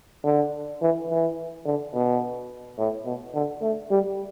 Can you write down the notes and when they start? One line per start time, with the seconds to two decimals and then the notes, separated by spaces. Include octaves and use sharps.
0.24 D3
0.81 E3
1.09 E3
1.66 D3
1.94 B2
2.78 A2
3.05 B2
3.34 D3
3.62 A3
3.91 G3